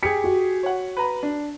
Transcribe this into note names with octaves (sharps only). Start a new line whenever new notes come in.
G4 G#4 B6 C#7
F#4
C#5 F#5
B4 A#5 B5
D4